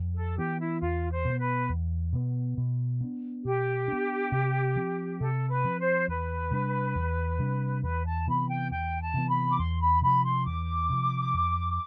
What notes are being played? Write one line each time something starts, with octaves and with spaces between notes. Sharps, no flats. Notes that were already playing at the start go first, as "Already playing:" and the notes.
Already playing: F2
A4
E3 B3 G4
E4
E2 F4
C5
B2
B3
B4
E2
B2 B3
B2
B3 D4
B2 G4
B3 D4
C3
F3 C4
C3 A4
B4
F3 C4
C5
E2 B4
C3 G3 D4
E2
C3 G3 D4
E2 B4
A5
C3 E3 B3 B5
G5
E2 G5
A5
C3 E3 B3
B5
D6
E2 C6
B5
C3 F3 B5
C6
E2 D6
C3 F3
F2